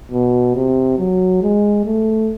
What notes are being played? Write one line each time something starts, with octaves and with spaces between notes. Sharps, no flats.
B2
C3
F#3
G#3
A3